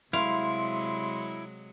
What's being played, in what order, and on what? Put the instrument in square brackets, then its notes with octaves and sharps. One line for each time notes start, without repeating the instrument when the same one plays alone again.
[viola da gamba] C3 F#3 G#3 [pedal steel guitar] E4 [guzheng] F5 [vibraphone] C6